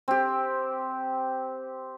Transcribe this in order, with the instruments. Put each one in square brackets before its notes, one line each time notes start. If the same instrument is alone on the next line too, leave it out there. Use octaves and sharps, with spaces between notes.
[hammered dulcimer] C4 G4